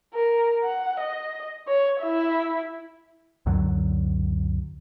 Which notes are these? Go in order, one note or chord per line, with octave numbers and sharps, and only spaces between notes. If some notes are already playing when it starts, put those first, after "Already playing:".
A#4
F#5
D#5
C#5
E4 E5
C#2 F#2 D3 F#3